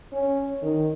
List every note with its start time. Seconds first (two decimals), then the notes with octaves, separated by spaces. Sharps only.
0.13 C#4
0.62 D#3